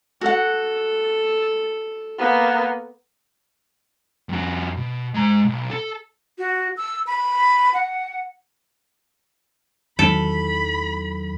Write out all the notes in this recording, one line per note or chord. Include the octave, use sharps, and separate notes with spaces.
F#4 A4 F#5
A#3 B3
F2 F#4
B2
G#3 A#5
B1
A4
F#4
E6
B5
F#5
E2 D#3 E3 F#3 A4 B5